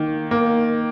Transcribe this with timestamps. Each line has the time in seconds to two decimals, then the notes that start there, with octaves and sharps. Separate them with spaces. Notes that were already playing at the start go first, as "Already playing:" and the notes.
Already playing: D#3 A#3
0.31 A#3